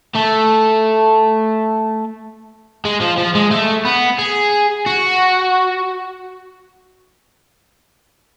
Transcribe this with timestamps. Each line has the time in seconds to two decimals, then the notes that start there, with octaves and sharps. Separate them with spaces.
0.15 A3
2.85 G#3
3.01 F3
3.18 F3
3.35 G#3
3.51 A3
3.85 B3
4.19 G#4
4.86 F#4